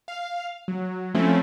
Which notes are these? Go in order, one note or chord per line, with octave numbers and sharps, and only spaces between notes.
F5
F#3
F3 A3 C4 C#4 E4